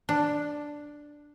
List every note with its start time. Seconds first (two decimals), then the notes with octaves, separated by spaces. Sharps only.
0.09 D4